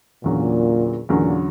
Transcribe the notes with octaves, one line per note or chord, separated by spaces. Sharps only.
E2 A#2 D3 F#3 C#4
E2 A#2 D3 F#3 C#4